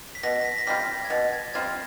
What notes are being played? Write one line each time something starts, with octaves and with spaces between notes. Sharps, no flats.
B6
B2 A#6
A#6
B6
A#6
G3 C4 F4 B6
A#6
G#6
B2 A6
G#6
G3 C4 F4 G#6